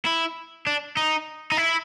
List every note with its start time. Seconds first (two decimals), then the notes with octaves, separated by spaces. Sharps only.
0.06 E4
0.67 D4
0.97 D#4
1.52 D#4
1.57 E4